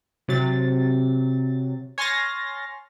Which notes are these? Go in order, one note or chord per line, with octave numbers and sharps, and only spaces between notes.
C3 F#3 A6
C#5 G#5 C6 F6 A6 A#6